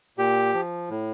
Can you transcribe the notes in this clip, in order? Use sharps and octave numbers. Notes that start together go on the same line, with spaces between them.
A#2 G4
F3
A2